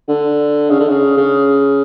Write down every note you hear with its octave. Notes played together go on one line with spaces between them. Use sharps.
D3
C#3
D3
C#3
C#3